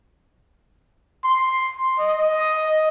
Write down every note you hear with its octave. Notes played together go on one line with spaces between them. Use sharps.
C6
D#5